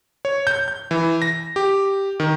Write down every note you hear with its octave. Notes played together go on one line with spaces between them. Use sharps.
C#5
G6
G6
E3
A#6
G4
D#3